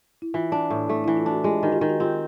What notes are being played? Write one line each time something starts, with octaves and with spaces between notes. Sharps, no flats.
E4
E3 F4
D4
A2
A3
E3 E4
F4
D4
F#4
G#3 F4 G4
D#3 F#4
F4 G4
D#3
F#4
C4 F4 G4